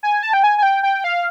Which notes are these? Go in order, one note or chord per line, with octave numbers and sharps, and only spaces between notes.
G#5
A5
G5
G#5
G#5
G5
G5
F5